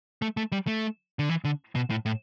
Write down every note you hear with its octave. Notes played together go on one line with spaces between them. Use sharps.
A3
A3
G3
A3
D3
E3
D3
B2
A2
A2